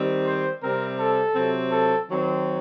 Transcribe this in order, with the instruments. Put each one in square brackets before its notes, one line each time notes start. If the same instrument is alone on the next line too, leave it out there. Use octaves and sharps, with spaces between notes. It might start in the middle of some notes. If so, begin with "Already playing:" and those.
Already playing: [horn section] D#3 G3 C4
C5
C3 G3 C4 A#4
A4
C3 F#3 C4
A4
D#3 F#3 C4